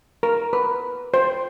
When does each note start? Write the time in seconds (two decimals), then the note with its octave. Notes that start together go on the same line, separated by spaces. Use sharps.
0.23 A#4
0.53 B4
1.14 C5